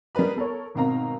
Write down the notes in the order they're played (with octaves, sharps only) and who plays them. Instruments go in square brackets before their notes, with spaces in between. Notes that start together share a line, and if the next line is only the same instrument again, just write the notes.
[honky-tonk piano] G3 G#4 A#4 B4 B5
B3 A4 A#4 C#5
G#1 B2 A#3 C4 F5 A#5